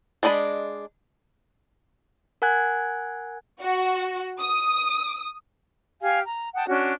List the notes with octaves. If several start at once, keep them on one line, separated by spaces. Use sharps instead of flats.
G#3 D4 D5 D#5 B5
A#4 F#5 G#5 F#6 G#6
F#4
D#6
G4 F5 G#5 F6
A#5
F#5 G5 A5 D#6
C#4 D4 F#4